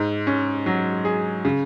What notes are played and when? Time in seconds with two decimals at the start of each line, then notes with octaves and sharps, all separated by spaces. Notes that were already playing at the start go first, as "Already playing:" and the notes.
Already playing: G#2
0.27 C#4
0.66 F#3
1.05 G#4
1.45 C#3